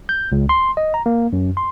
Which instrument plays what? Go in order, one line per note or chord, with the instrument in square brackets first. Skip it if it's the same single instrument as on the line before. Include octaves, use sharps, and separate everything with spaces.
[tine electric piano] G6
C#2
C6
D#5
A#5
A#3
F#2
C6